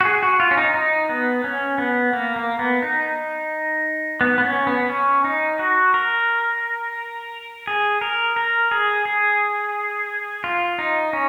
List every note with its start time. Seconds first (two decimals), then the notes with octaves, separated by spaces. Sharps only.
0.01 F#4
0.05 G#4
0.23 F#4
0.40 F4
0.51 C#4
0.57 D#4
0.74 D#4
1.09 B3
1.44 C#4
1.78 B3
2.13 A#3
2.36 A#3
2.59 B3
2.82 D#4
4.21 B3
4.38 B3
4.44 C#4
4.67 B3
4.90 C#4
5.24 D#4
5.59 F#4
5.94 A#4
7.67 G#4
8.01 A#4
8.36 A#4
8.71 G#4
9.05 G#4
10.44 F4
10.79 D#4
11.13 C#4